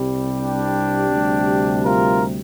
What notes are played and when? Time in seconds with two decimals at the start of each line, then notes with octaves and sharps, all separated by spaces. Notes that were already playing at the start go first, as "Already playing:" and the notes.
Already playing: C2 C3 G3
0.38 D4 G4
1.11 D2 C3 G3
1.85 F4 A#4